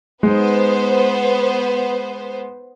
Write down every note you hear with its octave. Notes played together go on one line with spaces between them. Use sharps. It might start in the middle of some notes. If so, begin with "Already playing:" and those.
G#3 B3 D#4 C5